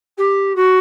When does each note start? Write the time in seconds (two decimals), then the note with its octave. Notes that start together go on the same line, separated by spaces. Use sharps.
0.18 G4
0.55 F#4